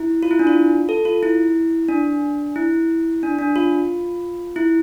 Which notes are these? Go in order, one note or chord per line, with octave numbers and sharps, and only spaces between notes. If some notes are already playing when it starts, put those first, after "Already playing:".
Already playing: E4
F4
E4
D4
F4
A4
F4
E4
D4
E4
D4
D4
F4
E4